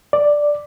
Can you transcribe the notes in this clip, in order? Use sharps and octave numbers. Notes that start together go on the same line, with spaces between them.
D5